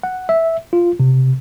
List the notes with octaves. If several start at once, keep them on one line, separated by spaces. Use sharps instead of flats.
F#5
E5
F4
C3